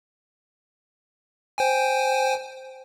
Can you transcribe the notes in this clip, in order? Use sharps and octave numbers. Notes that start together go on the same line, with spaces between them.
C5 G5 G#5